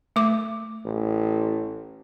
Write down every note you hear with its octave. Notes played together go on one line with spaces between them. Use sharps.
A3 D6
A1